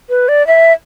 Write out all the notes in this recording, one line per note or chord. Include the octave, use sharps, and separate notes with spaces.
B4
D5
E5